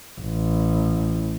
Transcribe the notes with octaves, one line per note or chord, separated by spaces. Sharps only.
A1